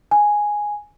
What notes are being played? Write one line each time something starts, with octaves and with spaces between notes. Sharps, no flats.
G#5